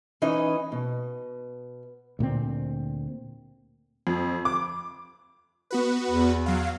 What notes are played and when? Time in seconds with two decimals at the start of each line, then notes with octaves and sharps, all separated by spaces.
0.22 E3 C#4 D#4 D#5
0.72 B2
2.19 D2 A#2 G3 C4
4.07 F2
4.45 D6
5.71 B3 F#4 B4
6.09 E2
6.46 F#3 F5